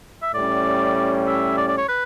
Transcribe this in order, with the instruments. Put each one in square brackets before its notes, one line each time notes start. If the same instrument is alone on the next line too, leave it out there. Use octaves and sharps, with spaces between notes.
[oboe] E5
[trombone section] A2 G3 C#4 [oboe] D5
[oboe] E5
D5
D5
C#5
B4